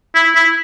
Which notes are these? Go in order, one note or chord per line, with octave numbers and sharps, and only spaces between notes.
E4
E4